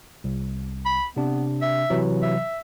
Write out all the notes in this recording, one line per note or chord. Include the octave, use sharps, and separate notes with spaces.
C2
B5
C3 B3 D4
E5
C3 E3 F#3
E5